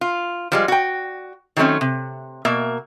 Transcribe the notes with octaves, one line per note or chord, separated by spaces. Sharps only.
F4
F3 G3 G#3
F#4 G5
D#3 F#3 A3 C4 C#4
C3
B2 A#3 E5